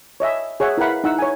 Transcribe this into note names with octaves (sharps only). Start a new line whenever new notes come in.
C#5 D#5 E5 G#5
G#4 C#5 E5 F#5
E4 A#4 B4 F5 F#5 B5
D#4 E4 F#5 E6
C#5 G#5